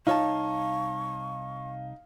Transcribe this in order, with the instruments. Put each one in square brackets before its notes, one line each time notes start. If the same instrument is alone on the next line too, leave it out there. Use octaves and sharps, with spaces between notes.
[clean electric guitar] C2 C#5 A5 [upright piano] D#4 [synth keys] F5 [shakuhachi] C#6